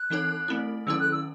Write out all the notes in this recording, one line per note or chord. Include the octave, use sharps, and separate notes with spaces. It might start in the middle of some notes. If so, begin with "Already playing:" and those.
Already playing: F#6
E3 C4 D#4 A4 C#5
A3 C4 E4
D#3 F#3 C#4 E4 A4 E6
F#6
E6